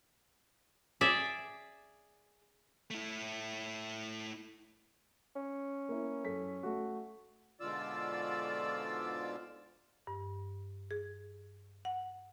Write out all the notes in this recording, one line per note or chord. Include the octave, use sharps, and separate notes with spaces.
G#4 D5 E5
A3 E4
C#4
A#3 E4
F#2 A4 B6
A3 F#4
G#2 B2 D3 F4 D5 E6
G2
G#4
F#5